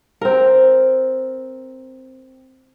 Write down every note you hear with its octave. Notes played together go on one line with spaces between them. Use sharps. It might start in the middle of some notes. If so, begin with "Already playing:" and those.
C4 A#4